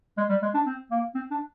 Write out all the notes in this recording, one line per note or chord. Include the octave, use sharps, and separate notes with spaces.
G#3
G3
G#3
D4
C4
A#3
C4
D4